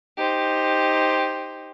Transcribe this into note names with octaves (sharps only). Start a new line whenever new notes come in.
D#4 G4 C5